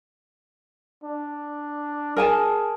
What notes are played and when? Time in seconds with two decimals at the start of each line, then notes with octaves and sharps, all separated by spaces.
1.03 D4
2.16 G#4 A#4 G#5 A5